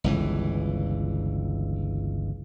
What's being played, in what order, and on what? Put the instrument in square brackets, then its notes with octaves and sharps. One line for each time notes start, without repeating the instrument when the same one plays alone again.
[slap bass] G1 C#2 E3